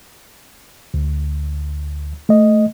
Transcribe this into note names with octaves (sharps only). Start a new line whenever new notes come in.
D2
A3 D#5